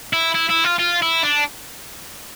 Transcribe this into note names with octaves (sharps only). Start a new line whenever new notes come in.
E4
E4
E4
F4
F4
E4
D4